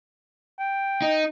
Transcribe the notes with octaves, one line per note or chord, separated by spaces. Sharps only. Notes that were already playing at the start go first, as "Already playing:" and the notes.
G5
D#4